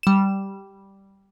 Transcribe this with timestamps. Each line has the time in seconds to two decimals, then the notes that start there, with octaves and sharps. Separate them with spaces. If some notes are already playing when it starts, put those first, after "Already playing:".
0.03 G3 E7